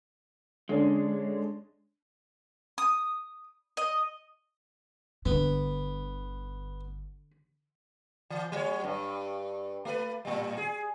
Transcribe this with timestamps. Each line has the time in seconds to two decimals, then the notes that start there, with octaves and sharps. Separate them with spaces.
0.69 D3 G#3 C#4 D4
2.78 D#6
3.77 D#5
5.26 G1 D3 B3
8.30 E3
8.52 F#3 C#5
8.84 G2
9.85 A3 B4
10.25 A2 G3
10.58 G#4